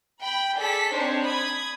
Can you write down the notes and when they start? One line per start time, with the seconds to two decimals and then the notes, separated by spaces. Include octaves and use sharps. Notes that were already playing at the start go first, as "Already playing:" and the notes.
0.21 G5 B5
0.58 G#4 A4 D5 B6
0.92 C4 D4 D#4 C5 C#5
1.23 B5 D#6 G#6